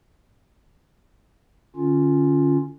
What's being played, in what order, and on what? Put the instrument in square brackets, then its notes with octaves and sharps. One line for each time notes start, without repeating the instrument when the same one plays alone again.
[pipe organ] D3 C#4 F4